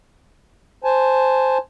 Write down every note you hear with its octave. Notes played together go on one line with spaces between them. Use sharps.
C5 G#5 A5